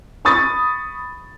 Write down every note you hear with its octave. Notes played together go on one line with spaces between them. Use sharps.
B5 C#6 D#6 A6